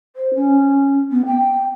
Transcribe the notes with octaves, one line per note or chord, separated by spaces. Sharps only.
C5
C#4
B3
G5